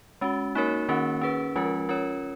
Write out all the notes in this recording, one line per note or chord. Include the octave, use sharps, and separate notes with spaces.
G#3 C#4 F#4
A#3 D#4 F#4 A#4 C#5
D#3 A#3 C#4 F#4 A#4
C#4 G#4 B4
F3 G#3 C#4 F4 A#4
C#4 F4 A#4 C#5